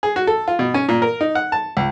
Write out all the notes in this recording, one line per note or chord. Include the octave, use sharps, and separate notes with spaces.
G#4
F#4
A4
F4
B2
C#4
A#2
A#4
D#4
F#5
A5
C#2